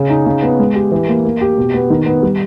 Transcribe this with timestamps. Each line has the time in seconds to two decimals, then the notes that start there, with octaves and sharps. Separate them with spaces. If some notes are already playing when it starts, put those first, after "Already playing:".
Already playing: C#3 C#4
0.10 D#4
0.26 C#3
0.42 B3
0.59 G#3
0.75 G4
0.92 E3
1.08 A#3
1.25 A#3
1.41 G4
1.58 B2
1.74 B3
1.90 D#3
2.06 B3
2.23 G3